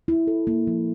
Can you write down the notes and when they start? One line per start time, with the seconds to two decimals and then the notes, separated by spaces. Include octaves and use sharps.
0.08 E4
0.27 A4
0.47 A#3
0.67 F3